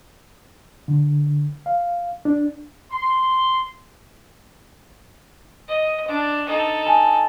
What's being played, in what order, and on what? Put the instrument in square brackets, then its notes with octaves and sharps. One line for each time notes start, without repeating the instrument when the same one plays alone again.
[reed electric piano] D3
F5
D4
[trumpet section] C6
[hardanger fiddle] D#5
D4
D#4 A4
[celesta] G#5 A5